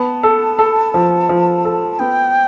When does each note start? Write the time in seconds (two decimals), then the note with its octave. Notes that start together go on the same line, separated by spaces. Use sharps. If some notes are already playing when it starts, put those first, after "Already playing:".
Already playing: B3 A5
0.23 A4
0.59 A4
0.94 F3
1.29 F3
1.65 A4
1.99 B3 G5